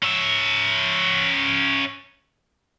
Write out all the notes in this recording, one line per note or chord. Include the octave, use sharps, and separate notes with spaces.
C#4 E5